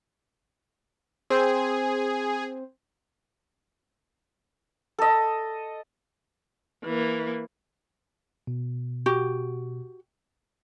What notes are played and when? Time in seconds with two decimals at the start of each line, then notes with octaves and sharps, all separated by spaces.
1.30 C4 G#4 C5
4.98 A4 D#5
6.84 E3 A#3
8.47 B2
9.06 F#4 G4